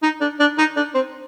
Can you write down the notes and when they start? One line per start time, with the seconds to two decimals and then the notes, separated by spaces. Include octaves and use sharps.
0.03 D#4
0.21 D4
0.40 D4
0.58 D#4
0.76 D4
0.94 C4